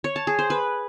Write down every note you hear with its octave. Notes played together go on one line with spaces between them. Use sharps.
C#5
A5
G#4
C5
B4